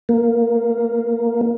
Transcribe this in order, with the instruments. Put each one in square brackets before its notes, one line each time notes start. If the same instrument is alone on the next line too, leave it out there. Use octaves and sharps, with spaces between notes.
[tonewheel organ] A#3